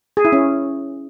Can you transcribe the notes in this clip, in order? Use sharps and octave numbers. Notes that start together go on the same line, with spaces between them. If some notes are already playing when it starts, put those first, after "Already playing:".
G#4
E4
C#4